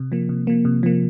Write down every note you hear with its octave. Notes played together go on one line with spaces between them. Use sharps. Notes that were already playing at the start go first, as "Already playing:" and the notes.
Already playing: C3
F3 A#3
C3
F3 A#3
C3
F3 A#3